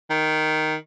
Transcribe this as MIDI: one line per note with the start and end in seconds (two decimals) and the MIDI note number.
0.10 0.75 51